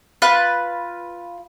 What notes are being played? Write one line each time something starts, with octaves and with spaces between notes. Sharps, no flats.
F4 B4 F#6